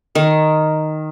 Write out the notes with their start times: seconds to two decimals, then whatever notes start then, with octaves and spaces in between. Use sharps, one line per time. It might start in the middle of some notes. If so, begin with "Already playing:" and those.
0.15 D#3